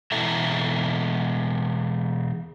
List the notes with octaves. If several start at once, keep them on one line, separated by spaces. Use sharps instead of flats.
B2 E3 E4 A4 E5 A#5